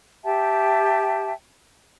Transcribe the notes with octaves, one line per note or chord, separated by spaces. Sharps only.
G4 E5 G5 A5